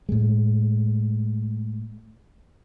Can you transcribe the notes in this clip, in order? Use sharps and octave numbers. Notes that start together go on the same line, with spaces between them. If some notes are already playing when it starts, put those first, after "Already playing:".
A2 G#3